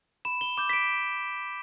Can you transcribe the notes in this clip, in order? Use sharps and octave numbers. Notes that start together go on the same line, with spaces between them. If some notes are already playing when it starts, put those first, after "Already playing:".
B5 E7
G7
D6 G6 E7
B6
D7